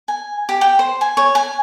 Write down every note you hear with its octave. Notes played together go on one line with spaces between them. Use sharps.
G#5
G4
G5
C5
G#5
C#5
G#5